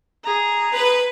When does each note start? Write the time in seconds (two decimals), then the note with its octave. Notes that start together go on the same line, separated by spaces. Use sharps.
0.24 G#4 A#5
0.74 B4